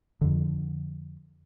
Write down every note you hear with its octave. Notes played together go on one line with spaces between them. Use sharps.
F2 D3